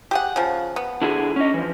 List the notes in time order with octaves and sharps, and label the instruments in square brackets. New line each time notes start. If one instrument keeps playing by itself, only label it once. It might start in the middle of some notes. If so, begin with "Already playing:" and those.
[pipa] G4 G#4 F#5
C#3 F3
B3
[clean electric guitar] D3 E4 G#4
C#4 D#5
E3 F3